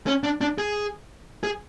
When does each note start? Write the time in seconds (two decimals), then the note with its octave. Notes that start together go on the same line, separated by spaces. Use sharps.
0.07 C#4
0.23 D4
0.41 D4
0.58 G#4
1.44 G#4